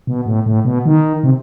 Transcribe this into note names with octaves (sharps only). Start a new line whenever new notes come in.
B2
A2
A2
B2
D#3
C3